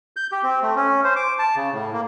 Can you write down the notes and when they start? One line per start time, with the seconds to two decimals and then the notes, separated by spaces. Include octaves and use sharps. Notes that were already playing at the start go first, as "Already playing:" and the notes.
0.16 G6
0.32 G4
0.43 C4
0.63 A3
0.76 C#4
1.04 C5
1.16 D6
1.39 A5
1.56 C#3
1.73 A2
1.93 A#3